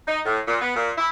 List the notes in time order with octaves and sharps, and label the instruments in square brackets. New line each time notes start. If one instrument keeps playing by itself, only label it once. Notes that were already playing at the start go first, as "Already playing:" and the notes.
[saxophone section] D#4
A2
A#2
B3
A#2
E4